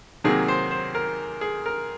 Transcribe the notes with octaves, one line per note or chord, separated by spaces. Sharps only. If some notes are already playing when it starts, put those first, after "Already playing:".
C3 D#3 F#3 A#3 G#4
C5
C5
A#4
G#4
A#4